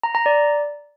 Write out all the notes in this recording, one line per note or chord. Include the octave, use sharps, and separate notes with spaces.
A#5
A#5
D5